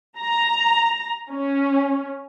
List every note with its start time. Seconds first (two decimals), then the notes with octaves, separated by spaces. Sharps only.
0.19 A#5
1.30 C#4